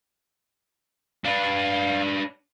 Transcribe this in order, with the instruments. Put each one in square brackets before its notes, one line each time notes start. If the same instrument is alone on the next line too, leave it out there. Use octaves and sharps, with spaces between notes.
[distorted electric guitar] D4 B4 [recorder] F5